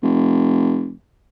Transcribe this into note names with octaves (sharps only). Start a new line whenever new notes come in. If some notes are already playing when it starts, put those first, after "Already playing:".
F1